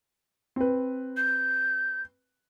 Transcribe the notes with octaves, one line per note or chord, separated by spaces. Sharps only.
C4 B4
G6